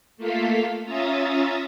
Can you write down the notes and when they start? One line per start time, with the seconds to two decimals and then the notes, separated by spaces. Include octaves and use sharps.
0.17 A3 A#3 F4 A4 F5 B6
0.86 C#4 F4 E5 A#5 D#6 A6